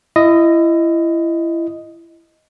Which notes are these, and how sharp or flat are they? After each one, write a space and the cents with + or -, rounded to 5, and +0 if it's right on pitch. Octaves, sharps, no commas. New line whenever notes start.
E4 +25 D#5 +0